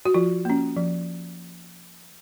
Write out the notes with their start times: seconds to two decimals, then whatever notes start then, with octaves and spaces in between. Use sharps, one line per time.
0.05 F#4
0.14 F3 F4
0.45 A#3 C#4
0.76 F3